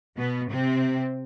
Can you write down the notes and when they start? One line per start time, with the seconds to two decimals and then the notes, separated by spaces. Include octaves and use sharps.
0.17 B2 B3
0.50 C3 C4